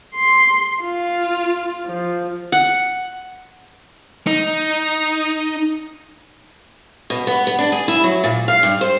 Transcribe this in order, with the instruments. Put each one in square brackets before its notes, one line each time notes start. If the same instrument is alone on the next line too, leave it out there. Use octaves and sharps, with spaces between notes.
[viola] C6
F4
F3
[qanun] F#5
[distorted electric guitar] D#4
[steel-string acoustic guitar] B2
B3
B3
D4
G#4
E4
F#3
A#2
F5
G2
C5